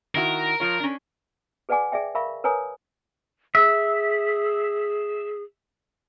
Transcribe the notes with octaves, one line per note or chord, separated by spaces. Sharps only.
D#3 E4 F#4 A#4
F3 F4 C#5
C#4 D4
G#4 B4 D5 F#5 G#5 D6
G#4 D5 E5 G5
A#4 E5 F5 B5 C#6
A#4 B4 C#5 G#5 A#5 D#6
G#4 E5